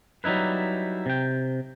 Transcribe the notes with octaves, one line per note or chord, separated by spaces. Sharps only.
F#3 G3 D#4 E4 B4
C3 G5